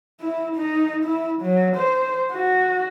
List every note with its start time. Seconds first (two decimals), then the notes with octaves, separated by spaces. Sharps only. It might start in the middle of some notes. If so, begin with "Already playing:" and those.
0.21 E4
0.56 D#4
1.05 E4
1.42 F#3
1.77 C5
2.32 F#4